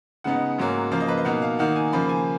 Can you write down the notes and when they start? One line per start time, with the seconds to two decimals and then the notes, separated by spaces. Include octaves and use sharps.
0.24 C#3 G#3 B3 D#4 F#5
0.58 G#2 F#3 A#3 C#4
0.91 C#3 F3 A#3 F5
1.00 D#5
1.08 B4
1.18 D#5
1.25 B2 A#3 D#4 F#5
1.42 F5
1.59 D#3 A#3 D#4 F#5
1.76 G#5
1.92 C#3 F3 A#3 B5
2.09 G#5